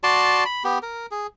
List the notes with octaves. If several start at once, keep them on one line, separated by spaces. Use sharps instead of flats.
F#4 D5 A5 C6
B5
B3 G4
A#4
G#4